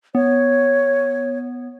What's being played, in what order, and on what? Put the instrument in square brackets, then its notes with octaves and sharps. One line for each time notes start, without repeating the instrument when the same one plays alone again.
[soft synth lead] B3 [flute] C#5